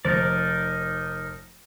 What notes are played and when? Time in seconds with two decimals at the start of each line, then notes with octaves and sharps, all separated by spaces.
0.05 F1 D#4 A#4 C5 D5